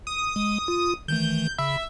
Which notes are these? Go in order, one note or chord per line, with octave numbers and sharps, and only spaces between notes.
D#6
G#3
F4
D#3 E3 A3 G6
C#3 E5 B5